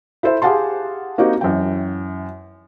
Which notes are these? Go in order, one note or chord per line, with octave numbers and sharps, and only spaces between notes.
E4 A4 C5 E5
G4 G#4 F5 F#5 A5 C6
A#3 C4 D#4 F#4 G4
F#2 E3 G5